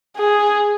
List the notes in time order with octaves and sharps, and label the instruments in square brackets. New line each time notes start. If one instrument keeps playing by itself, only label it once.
[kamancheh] G#4